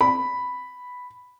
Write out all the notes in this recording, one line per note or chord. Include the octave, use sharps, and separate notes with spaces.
B5